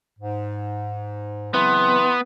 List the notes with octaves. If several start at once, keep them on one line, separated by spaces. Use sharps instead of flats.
G#2
C#3 E3 F#3 B3 C4 C6